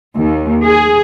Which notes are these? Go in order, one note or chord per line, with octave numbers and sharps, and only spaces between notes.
D#2
G#4